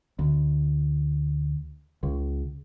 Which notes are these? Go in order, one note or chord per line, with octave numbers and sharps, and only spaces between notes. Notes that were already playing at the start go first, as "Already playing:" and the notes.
D2
C#2